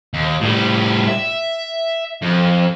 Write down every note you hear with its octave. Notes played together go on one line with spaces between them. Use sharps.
D#2
A2 G3
E5
F2